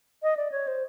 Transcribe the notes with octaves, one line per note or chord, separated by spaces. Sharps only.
D#5
D5
C#5
C5